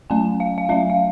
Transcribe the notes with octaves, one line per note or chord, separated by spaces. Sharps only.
F#3 A3 C#4 G#5
F5
F5
F#3 A3 C#4 E5
F5